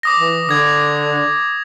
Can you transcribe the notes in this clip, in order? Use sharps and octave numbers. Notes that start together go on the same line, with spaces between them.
D6 D#6 A#6
E3
D3 D#6 G#6